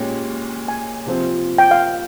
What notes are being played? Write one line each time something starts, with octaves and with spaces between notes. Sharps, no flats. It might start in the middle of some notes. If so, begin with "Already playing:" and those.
Already playing: A#2 G#3 C#4 G4
G#5
C3 F3 C4
G5
F5